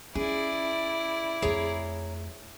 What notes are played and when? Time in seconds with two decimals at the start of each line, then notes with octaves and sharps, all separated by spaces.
0.15 C#4 E4 G#4 D5
1.42 F2 A3 G#4 C#5 A#5